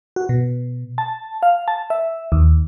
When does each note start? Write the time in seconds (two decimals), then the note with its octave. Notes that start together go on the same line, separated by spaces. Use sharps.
0.16 F#4
0.29 B2
0.98 A5
1.43 F5
1.68 A5
1.90 E5
2.32 D#2